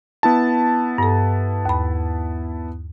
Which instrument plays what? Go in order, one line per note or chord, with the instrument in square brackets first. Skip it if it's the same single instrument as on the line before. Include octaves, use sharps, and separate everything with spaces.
[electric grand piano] B3 E4 A5
[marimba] G2 A4
D#2 B5